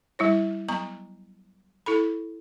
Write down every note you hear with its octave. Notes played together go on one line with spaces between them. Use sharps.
G3 E4 C#5
F#3 B3 A#5 C#6
E4 A4 B5